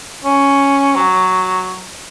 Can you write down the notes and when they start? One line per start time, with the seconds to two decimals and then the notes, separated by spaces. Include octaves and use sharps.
0.25 C#4
0.96 F#3